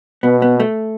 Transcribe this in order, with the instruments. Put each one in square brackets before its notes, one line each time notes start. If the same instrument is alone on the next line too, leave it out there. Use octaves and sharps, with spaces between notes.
[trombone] B2 [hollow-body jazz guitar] B3
[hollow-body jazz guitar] B3
A3